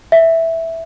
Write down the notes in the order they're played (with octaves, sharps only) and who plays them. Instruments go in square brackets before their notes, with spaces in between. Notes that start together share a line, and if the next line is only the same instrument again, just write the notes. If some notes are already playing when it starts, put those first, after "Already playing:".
[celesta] E5